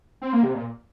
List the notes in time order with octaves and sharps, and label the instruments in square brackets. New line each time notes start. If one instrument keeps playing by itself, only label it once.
[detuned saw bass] C4
A#3
C3
A#2